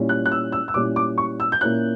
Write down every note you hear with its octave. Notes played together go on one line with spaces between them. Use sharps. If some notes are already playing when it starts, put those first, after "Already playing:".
Already playing: A#2 G3 C#4 E4
F#6
F#6
E6
E6
E6
A#2 G3 C#4 E4 D6
D6
C#6
E6
G6
A#2 A#3 C#4 E4 F#6